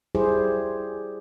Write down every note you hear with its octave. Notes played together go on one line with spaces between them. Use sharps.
G3 E4 G4 G#4 C5